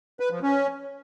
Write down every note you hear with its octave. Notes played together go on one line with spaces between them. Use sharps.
B4
F3
C#4